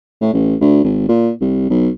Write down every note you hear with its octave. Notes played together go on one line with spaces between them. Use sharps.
A2
A1
D2
G#1
A#2
C2
B1